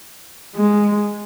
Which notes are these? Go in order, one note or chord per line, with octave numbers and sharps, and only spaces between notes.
G#3